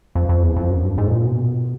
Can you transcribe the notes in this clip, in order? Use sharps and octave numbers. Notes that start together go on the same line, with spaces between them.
F2
F2
E2
F2
F#2
G2
G#2
A2
A#2
B2